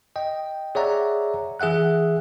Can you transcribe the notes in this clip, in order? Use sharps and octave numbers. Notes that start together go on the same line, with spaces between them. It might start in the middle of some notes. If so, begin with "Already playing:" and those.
D#5 G5
G#4 C#5 D5 E5 F#5 A#5
E3 G#4 E5 F#5 F#6